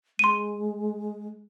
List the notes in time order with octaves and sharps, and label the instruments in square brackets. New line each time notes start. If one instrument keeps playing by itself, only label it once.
[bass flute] G#3 [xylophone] C6 D#7